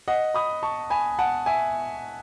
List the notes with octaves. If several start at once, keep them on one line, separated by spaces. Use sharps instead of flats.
D#5 F#5
B5 D#6
A5 C#6
G#5 B5
F#5 A5
E5 G#5